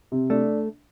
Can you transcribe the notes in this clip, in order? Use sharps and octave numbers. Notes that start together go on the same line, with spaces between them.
C3
A3 D4